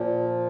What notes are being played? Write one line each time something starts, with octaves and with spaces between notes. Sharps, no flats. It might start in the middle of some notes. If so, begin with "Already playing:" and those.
Already playing: A#2 F3